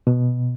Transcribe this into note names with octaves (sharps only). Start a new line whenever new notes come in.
B2